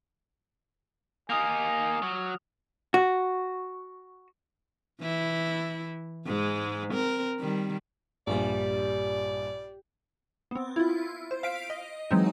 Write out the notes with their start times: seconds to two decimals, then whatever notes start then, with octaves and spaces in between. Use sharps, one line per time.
1.30 A#3 D#4 G#5 D#6 F6 F7
2.02 F#3
2.94 F#4
5.00 E3 E4
6.25 G#2 G#3
6.93 C4 A#4
7.40 D#3 G3
8.27 A#1 G2 A#2 G3 D5
10.51 B3 C4
10.76 E4 F4
11.31 C5
11.43 F5 B6 D7
11.70 D#5
12.11 E3 F#3 G#3 C4 D#4